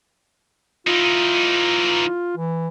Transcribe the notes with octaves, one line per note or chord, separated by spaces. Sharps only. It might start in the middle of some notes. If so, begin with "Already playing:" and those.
E3 D#4 F4
E3